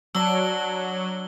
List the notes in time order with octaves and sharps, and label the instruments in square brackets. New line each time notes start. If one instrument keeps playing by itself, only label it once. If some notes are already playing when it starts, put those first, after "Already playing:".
[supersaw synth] F#3 [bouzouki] D4 [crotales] E6 G7